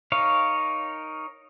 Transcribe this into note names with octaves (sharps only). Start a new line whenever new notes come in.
D#4 A#4 C#5 F5